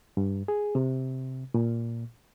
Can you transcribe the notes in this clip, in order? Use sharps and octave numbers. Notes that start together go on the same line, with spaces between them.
G2
G#4
C3
A#2